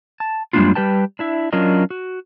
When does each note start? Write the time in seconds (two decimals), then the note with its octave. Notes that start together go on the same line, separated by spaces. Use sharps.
0.20 A5
0.53 F#2 G3 G#3 A#3 D4 F4
0.75 G3 G4 B4 G5 A5
1.19 D4 E4 E5
1.53 F#3 C#4 D4 F4 A#4 D#5
1.90 F#4